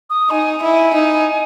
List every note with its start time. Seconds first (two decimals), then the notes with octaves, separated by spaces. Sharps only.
0.10 D#6
0.30 D#4 G#5
0.63 E4
0.72 G#5
0.94 D#4